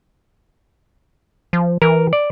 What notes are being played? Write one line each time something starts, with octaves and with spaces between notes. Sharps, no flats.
F3
E3 A#4
D5